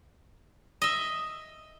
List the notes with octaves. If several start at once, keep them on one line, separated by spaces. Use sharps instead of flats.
D#5 E5